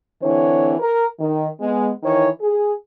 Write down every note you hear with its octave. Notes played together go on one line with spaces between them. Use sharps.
D3 E3 C4 C#5
A#4
D#3
G#3 B3
D#3 E3 C#5
G#4